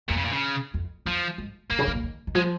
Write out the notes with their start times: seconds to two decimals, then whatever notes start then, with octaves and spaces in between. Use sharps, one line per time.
0.09 F2 A#2
0.18 C#3
0.25 A#2
0.33 C#3
0.74 F2
1.06 F2 F3
1.38 G#2
1.70 A#2 A#3
1.79 C#3
1.87 D#3
1.95 A#2
2.04 D#3
2.27 D#3
2.35 F3 G#3